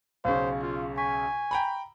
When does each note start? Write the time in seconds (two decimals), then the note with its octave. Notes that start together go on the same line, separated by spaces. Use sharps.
0.25 B1 C#3 C5 F5 C#6
0.62 F4
0.98 G#5 C#6 B6
1.51 G5 A#5 B5